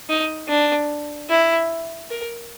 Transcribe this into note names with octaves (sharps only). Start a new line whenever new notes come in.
D#4
D4
E4
A#4